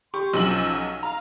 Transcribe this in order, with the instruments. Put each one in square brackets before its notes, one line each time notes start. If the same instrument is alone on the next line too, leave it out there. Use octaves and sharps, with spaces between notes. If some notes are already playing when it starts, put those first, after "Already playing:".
[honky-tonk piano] G4 C#6 [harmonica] C6
[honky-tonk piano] B1 F#3 F#7 [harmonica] F3 C#4 E6
[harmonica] F5 [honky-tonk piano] A#5